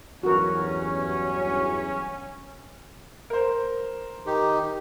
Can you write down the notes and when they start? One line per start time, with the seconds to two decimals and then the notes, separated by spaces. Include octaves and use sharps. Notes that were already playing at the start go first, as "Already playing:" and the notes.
0.23 E2 G2 F#3 C#4 F#4 A#4
3.30 A#4 C5
4.26 D#3 D#4 G4